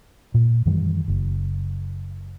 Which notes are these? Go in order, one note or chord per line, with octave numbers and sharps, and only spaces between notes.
A#2
F#2 D#3 E3 G3
F#1